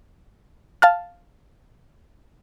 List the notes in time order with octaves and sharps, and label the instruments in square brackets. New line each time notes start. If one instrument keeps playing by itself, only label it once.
[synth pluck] F5 A5 F6